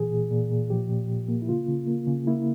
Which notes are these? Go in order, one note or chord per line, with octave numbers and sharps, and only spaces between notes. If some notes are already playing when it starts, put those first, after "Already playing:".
Already playing: A#2 E3 G#4
A#2
A#2
A#2
F3 G4
A#2
A#2
A#3
E4
C#3 F4
C#3
A#3
C#3
A#3 E4